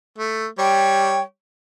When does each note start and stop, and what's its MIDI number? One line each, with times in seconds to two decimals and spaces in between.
0.18 0.47 57
0.59 1.21 55
0.59 1.21 73
0.59 1.21 79